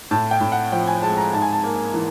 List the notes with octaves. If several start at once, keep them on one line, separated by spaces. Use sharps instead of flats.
A2 A5
G5
A2
F#5
F3 G5
G#5
G#3 A5
A#5
G#2 A5
G#5
A5
A#3
E3